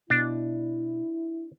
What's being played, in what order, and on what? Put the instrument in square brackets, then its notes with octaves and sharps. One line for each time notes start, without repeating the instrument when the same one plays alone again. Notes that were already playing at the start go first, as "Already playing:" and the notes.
[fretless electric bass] B2 [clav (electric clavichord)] D4 [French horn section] E4